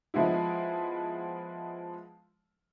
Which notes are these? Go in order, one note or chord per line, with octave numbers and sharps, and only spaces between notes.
F3 G#3 B3 E4